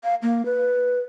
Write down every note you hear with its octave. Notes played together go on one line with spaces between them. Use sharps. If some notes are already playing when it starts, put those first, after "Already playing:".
F5
A#3
B4